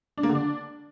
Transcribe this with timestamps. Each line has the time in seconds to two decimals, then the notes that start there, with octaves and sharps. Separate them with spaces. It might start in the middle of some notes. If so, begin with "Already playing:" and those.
0.18 D4
0.23 A#3
0.29 D3
0.35 D4